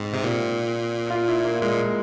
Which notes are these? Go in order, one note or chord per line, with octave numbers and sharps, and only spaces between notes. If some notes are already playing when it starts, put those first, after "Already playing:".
Already playing: G#2 C4
C3
A#2
F4
E4
A#3
A#2 G#3